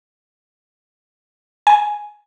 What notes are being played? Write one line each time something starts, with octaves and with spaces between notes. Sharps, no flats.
G#5